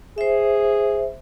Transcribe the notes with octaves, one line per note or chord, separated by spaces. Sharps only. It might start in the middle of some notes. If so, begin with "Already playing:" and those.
G#4 C5 E5